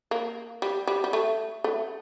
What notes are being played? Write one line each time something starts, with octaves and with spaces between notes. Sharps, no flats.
A#3
G3
G3
G3
A3
A3